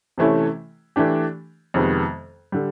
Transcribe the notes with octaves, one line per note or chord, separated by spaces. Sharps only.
C3 E3 A3 C#4 E4
E3 A3 D4 G4
F2 C3 D#3 G#3 B3
D3 G3